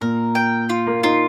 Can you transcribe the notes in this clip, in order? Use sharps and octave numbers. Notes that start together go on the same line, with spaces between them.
A#2 A#4
G5
F4
A#3
D#4 F4